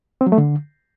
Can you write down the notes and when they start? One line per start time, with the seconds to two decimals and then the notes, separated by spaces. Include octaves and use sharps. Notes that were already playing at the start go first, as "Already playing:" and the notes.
0.21 C4
0.26 F#3
0.32 A3
0.38 D3